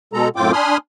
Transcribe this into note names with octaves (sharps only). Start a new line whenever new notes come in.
B2 G#3 A4 A#5
F#2 A2 C4 F4 G5 D6
D4 G#5 B5 C6 D#6 F6